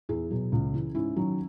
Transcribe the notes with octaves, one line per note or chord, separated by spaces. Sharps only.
E2 E4 G#4
B2 F#3
C#2
C#3 E3
G#2 C#4 E4
D#3 F#3